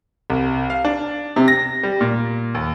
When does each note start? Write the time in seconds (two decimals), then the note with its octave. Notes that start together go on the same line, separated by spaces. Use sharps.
0.30 C2
0.70 F5
0.85 D4
1.36 C3
1.48 A#6
1.83 G3
2.01 A#2
2.54 D#2